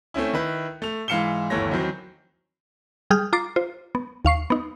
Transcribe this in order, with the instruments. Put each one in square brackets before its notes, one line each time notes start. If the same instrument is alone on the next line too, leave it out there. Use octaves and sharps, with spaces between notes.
[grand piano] A3 C4 C#4 E4
D#3 E4 B4
A3 F7
G#2 E3 F5 C#7 E7 G7
G1 D#2 E3 A3 C#5 A#6
D#3 E3 F#3 C4
[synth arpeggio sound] G3 G#4 D#6 F6 G6
F4 A#5 D6 A6 C7
F4 C5
B3
D#2 F5 C#6 C7
B3 D#4